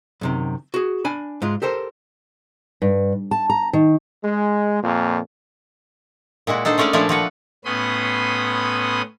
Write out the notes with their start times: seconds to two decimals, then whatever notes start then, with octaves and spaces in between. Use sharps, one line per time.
0.21 F#2 C3 D#3
0.74 F#4 G#4
1.05 D4 G#5 B5
1.42 G#2 G#3 F4
1.62 G4 A4 A#4 C5
2.82 G2
3.31 A5
3.50 A#5
3.73 D#3
4.24 G#3
4.82 F2 A#2
6.47 A#2 G#3 E4 F#4
6.65 D4 D#4 A4 C5
6.78 G#3 A3 C#4 A#4 D5
6.93 A#2 F3 A3 D4 E4
7.09 F3 F#4 B4 F#5
7.65 A2 B3 C#4 B5 C6 D#6